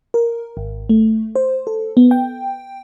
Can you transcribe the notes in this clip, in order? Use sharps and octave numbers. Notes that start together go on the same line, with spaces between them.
A#4
G#1
A3
C5
A4
B3
G5